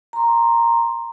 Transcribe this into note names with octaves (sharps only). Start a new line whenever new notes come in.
A#5 C6